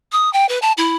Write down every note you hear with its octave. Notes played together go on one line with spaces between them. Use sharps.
D#6
G5
B4
A5
E4